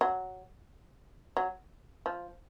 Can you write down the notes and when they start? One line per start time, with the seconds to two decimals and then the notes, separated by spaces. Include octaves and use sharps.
0.01 F#3
1.37 F#3
2.06 F3